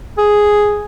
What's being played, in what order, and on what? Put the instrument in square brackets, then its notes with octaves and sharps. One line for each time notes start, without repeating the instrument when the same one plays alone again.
[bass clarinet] G#4